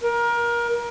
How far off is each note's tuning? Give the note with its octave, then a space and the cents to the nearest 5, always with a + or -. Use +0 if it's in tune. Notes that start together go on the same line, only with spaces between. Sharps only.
A#4 +25